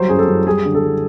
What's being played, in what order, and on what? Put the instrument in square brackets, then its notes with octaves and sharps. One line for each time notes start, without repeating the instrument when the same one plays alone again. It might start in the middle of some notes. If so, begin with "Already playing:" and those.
Already playing: [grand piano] F#3 G3 C5
F#2 G#4
A4
F#2
G3 G#4
D3
A4
G3